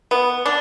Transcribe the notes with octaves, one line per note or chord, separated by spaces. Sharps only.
B3
D4